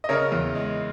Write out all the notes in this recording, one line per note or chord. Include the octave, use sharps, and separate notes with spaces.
D#5
C#3 A#4 C#5
E2
G#3